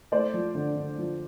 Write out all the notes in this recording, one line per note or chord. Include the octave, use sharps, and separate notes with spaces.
A3 C5 D5
F3
D3
D3
F3